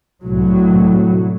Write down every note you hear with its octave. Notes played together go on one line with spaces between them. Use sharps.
C2 A2 F#3